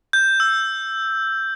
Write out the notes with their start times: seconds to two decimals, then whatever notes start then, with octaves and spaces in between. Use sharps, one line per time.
0.13 G6
0.40 E6